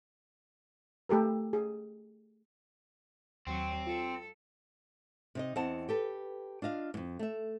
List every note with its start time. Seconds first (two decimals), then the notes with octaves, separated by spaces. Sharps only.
1.09 A3 G4 A4 A#4
1.53 G#4
3.47 D#2 F#3 C4
3.87 F4 A4
5.35 C3 D#4 D#5
5.56 E2 C4 D#5 F#5 A5
5.89 G4 A4 B4
6.62 D4 F4 D#5 F5
6.94 F2 G#2
7.19 A3 E5